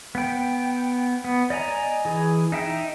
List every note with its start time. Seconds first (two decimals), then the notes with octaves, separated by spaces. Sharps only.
0.15 B3 G5
1.24 B3
1.50 D5 D#5 G#5 A#5
2.05 E3 G#4
2.52 D#4 E5 G5